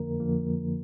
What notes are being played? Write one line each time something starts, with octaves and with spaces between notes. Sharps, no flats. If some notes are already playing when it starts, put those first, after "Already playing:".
Already playing: F2 D3 F3 A#3 A#4
F2 D3 F3 A#3